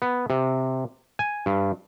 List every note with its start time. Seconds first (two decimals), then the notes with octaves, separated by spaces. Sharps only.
0.02 B3
0.30 C3
1.19 G#5
1.46 G2